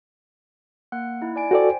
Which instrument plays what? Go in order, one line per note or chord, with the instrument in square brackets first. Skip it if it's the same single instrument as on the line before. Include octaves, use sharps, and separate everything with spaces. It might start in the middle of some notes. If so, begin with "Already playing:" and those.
[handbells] A#3 F#5 F#6
D#4 E4
D5 G#5 D7
[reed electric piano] F#4 A4 D5 [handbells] C5 G5 G#5